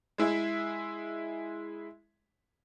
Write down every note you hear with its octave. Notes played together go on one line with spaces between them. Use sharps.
G#3 E4 G#4 E5